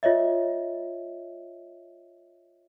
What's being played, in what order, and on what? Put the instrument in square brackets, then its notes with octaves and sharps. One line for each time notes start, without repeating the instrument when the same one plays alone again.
[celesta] F4 C#5 D#5 E5